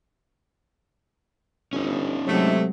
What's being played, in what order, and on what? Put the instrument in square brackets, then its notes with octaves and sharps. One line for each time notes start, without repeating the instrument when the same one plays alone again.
[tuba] G1 [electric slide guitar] C#4 D#4
[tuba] C3 [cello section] F#3 G#3 [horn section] A3